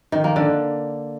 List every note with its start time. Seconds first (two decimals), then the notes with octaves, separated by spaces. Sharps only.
0.12 D#3
0.24 A#3
0.36 D3